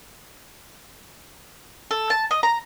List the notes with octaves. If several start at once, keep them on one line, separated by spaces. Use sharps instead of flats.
A4
A5
D#5
A#5